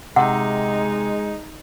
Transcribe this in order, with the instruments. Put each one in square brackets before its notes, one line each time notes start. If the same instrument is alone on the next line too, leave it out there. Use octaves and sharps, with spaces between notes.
[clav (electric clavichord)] C3 [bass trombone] G#3 [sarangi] D#4 [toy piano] F#5